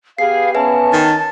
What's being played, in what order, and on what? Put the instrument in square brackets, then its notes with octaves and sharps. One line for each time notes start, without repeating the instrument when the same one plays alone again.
[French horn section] B3 G4 G#4 [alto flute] F5 [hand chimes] C7
[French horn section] B3 C#4 [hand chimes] B4 E5 G#5 [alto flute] A5
[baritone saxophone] D#3 [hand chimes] A6